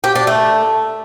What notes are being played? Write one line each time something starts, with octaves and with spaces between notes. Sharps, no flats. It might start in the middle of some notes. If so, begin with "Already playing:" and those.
G4
D4
A3